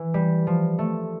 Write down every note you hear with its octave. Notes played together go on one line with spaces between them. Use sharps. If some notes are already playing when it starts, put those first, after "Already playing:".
Already playing: E3
G3
F3
A3